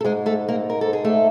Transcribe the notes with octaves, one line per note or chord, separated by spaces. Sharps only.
A4
G#2 G#3 G#4
A3 A4
A#3 A#4
A#4
A4
G#4
A3 A4